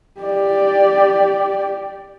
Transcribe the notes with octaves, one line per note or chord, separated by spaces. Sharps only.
G4 D5